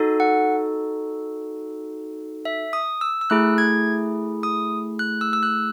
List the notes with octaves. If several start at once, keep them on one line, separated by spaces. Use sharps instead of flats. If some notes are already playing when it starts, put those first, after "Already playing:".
Already playing: D#4 F#4 A4
F#5
E5
D#6
E6
E6
A3 E4 G#4 F#6
G#6
D#6
F#6
E6
E6
F#6